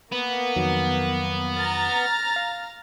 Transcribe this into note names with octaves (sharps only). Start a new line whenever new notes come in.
A#3 B3
F2 D#3 F#3
A#5 F6 A6
F5